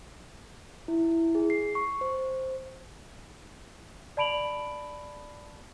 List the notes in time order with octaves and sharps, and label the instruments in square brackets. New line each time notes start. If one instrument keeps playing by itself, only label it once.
[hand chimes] E4
E4
G#4
C7
C#6
C5
[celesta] D5 A5 B5 D7 F7 F#7